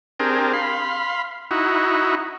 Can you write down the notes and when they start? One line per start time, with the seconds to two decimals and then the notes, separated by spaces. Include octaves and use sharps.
0.20 C4 D4 G4 G#4 A#4
0.53 F5 B5 C6
1.51 D#4 E4 F#4